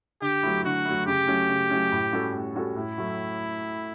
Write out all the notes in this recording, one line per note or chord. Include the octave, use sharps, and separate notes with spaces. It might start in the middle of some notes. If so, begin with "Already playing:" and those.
D3 G4
F#3 A3 E4
D3 F#4
F#3 A3 E4
C#3 G4
F#3 A3 C#4
C#3
F#3 A3 C#4
A2
G3 C#4 F#4 A4
A2
G3 C#4 F#4 A4
A2 E4
F#3 A3